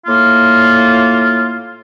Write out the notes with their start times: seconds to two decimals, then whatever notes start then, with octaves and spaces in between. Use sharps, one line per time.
0.06 A2 A#3 F4